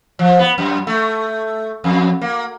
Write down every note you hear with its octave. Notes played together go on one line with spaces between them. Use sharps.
F3
B3
F#2
A3
F2
A#3